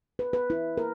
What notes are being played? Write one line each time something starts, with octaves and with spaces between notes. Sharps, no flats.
B4
B4
E4
A#4